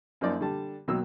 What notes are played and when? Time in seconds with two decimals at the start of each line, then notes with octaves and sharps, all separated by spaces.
0.21 F#2 F3 A#3 D#4 D5
0.41 D3 G3 A5
0.88 B2 D#3 F#3 A#3 E6